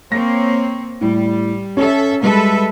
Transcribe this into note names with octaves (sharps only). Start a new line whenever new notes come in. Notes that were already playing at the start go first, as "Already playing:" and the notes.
A#3 C4 C#5 A#6
A2 G3
C#4 A4 E5
G3 G#3 A4 B4 E5